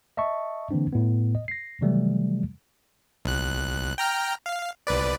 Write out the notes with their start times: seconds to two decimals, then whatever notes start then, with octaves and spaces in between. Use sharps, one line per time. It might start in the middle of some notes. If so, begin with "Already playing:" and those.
0.17 D#5 E5 A5 C#6
0.71 D3 E3 A#3 C4 D4
0.93 A2 B3
1.35 D#5
1.48 A#6 C7
1.81 C3 D#3 E3 F#3 G3 A3
3.25 C2 F#6
3.98 G5 A#5 F6
4.46 F5
4.87 C2 B4 D5